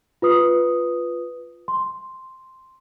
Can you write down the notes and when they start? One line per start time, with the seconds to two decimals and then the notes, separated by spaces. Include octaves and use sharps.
0.22 F4 B4 D#6
1.68 C6